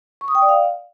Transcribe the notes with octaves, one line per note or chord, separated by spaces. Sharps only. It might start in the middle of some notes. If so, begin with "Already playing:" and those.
C#6
D#6
G5
D5
F5